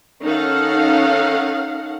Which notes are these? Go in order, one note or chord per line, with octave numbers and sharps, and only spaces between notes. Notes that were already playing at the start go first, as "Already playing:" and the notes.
D#3 C#4 D#4 A4 F5 F#5